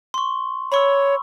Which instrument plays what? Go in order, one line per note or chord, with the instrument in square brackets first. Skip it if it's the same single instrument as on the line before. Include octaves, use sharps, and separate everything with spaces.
[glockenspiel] C6 C#6
[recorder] C#5 [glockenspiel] B5 C#6 E6